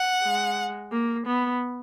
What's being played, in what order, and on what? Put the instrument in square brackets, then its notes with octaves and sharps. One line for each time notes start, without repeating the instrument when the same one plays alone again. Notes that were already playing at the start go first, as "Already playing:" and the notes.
Already playing: [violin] F#5
[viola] G#3
A#3
B3